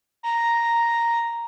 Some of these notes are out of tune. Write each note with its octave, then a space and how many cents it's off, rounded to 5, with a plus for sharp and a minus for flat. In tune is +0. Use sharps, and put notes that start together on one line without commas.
A#5 +0